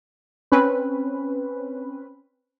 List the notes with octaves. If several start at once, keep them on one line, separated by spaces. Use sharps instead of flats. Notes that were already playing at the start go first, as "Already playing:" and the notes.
C4 C#4 B4